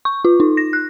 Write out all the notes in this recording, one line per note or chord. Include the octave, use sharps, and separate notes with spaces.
C#6
F4
D#4
A#6
F#6